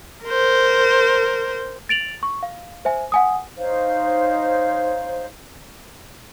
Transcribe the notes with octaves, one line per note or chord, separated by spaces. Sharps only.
A#4 C5
A6 D7 F7 F#7
C#6
F5
C5 E5 G#5
F#5 G#5 D#6
D#4 C5 C#5 F5